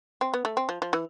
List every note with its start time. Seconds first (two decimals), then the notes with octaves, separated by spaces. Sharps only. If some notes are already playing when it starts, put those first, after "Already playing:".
0.21 C4
0.34 B3
0.45 A3
0.57 C4
0.69 F3
0.82 F3
0.93 E3